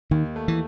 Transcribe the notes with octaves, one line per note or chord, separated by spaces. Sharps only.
D#2 D#3
A3
E3